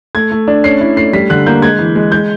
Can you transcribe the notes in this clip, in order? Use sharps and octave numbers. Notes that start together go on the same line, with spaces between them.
A3 G#6
A3
D4
C#4 C7
E4
A3 C7
G3 B6
D3 F#6
A#3 G6
G#3 G#6
E3
G#3
G#3 G6